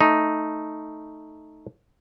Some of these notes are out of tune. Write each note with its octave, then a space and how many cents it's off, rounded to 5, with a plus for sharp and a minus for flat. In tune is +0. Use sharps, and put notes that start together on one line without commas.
A3 +0 D#4 +0